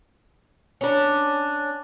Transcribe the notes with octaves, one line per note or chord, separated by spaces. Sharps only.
C#4 D4